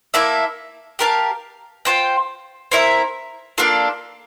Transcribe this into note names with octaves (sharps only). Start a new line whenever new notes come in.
A#3 E4 A4 E5
G4 A#4 F5 A5
F4 C5 G5
C4 E4 A#4 E5
A#3 D4 F4 A4